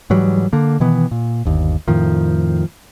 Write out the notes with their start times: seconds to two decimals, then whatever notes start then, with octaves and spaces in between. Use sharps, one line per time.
0.10 G#2 E3 F#3 G3
0.53 D3 A#3
0.80 B2 D#3 E3 B3
1.11 A#2
1.45 G1 D#2
1.88 F2 A2 D#3 F3